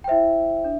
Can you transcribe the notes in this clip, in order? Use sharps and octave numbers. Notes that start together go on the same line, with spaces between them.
G5
E4 C5 E5
D4